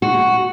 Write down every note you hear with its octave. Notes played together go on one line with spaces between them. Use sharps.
F#4